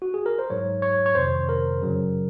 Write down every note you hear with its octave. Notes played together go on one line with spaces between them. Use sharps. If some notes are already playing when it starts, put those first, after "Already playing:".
F#4
G#4
A#4
C5
G#2 F#3 C#5
C#5
C#5
F2 C3 D#3 C5
A#4
F#2 C#3 F#3